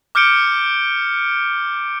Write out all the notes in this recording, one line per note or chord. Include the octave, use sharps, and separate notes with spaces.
D6 F6 G6 C#7 D7 G7